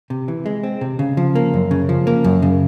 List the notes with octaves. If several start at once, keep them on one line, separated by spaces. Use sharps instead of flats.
C3
E3
G#3
C4
C3
C#3
F3
A#3
F#2
C#3
F3
A#3
F#2
C#3